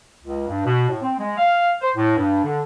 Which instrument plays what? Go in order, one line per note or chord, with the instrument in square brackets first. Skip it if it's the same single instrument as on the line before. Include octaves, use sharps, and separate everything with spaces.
[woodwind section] C#2
G2
B2
A2
C4
G#3
F5
C5
A2
G2
D3